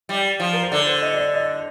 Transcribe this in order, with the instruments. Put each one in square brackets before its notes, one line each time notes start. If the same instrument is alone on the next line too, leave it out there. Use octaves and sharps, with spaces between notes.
[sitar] G3
F3
[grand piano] A#4
C5
[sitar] D3 [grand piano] D5
[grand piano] C5
D#5
D5
D#5
D#5